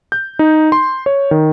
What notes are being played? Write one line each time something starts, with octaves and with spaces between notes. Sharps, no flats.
G6
D#4
C6
C#5
D#3